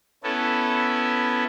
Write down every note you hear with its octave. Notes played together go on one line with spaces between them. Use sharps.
B3 C#4 E4 A4